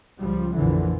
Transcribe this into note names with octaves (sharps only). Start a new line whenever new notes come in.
C#2 F3 G3
A#1 F2 A#2 D3 E3